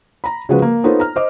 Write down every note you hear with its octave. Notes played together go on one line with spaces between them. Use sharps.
A#5 B5
C#3 F3 G#3 F#4 B4
A#3
B3 D#4 F4 A4 C5 C#5
A#5 F6
C5 D#5 D6